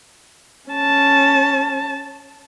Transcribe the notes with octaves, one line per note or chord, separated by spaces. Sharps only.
C#4 A5